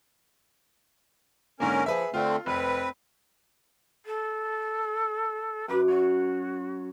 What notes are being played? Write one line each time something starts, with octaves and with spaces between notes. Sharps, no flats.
G#2 D3 A#3 C#4 A#4
F3 G#4 B4 E5
D3 A3 C4 F4
F1 C4 B4
A4
F#2 B4 D6
F#4 C#5